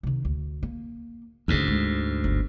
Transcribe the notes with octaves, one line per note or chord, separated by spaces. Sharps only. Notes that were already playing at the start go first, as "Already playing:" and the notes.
C3 D#3
D2
A#3
D2 G#2 D3 C#4
G#3
G1